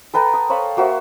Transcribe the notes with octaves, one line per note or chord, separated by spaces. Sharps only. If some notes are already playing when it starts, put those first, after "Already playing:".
A4 B4 G5 A#5
D#6
C5 C#5 F5 B5
A#3 F#4 C5 E5